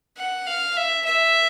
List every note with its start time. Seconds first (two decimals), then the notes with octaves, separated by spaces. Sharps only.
0.17 F#5
0.47 F5
0.76 E5
1.04 E5